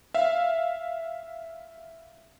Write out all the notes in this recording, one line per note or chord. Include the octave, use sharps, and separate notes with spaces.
E5 F5